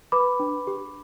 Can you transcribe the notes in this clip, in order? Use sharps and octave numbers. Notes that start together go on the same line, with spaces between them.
B4 B5 D6
D4
G4